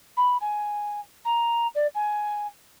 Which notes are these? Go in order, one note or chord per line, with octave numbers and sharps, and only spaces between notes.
B5
G#5
A#5
D5
G#5